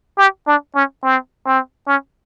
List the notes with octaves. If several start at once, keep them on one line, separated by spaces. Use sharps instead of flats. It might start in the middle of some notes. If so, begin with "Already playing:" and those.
G4
D4
C#4
C4
C4
C#4